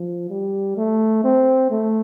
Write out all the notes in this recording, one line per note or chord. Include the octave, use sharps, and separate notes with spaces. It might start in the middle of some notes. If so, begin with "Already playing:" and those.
Already playing: F3
G3
A3
C4
A3